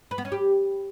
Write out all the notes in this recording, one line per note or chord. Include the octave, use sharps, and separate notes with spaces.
B4
B3
C#4
G4